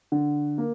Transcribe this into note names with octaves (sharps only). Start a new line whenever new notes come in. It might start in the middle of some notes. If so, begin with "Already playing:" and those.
D3
A#3